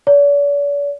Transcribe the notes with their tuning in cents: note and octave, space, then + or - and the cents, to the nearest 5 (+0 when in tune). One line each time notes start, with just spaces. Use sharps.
D5 -45